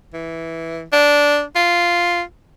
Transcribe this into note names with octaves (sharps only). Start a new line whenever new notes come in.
E3
D4
F4